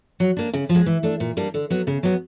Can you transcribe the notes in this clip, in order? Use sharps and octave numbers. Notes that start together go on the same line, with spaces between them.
F#3
A#3 D4
C#3
F3
G#3
E3
A3 D4
A#2
G3 A#3 D4
D3
F#3 B3
C#3
F#3 B3